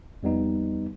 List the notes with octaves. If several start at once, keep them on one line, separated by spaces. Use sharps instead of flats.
F2 G3 B3 D#4